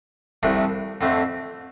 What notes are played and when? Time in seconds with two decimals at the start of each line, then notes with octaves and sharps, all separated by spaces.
0.43 C2 C3 F3 A3 D4
1.01 F2 D3 A3 C4